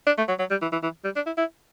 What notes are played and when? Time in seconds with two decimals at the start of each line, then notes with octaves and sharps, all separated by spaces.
0.06 D4
0.18 A3
0.28 F#3
0.39 F#3
0.50 G3
0.62 E3
0.72 E3
0.83 E3
1.04 G3
1.16 D4
1.26 E4
1.37 E4